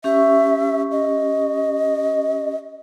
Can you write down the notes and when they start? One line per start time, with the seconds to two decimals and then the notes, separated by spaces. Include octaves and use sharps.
0.04 C#4 G4 E5 C#6
0.92 D#5